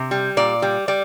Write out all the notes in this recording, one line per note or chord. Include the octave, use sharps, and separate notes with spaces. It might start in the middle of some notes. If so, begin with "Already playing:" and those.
Already playing: C3
G3
A#2 D5
G3
G3 D5